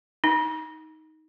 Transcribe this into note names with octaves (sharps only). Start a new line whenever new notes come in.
D#4